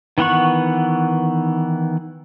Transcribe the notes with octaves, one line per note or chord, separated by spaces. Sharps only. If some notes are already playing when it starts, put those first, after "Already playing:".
D#3 E3 B3 F#5 C#6